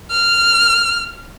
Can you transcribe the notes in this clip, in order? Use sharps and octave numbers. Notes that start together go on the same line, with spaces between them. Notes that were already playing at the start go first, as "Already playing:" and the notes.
F6